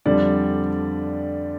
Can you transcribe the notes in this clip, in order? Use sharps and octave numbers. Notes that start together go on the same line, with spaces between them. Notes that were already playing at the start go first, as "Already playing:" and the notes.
F2 D3 G3 D5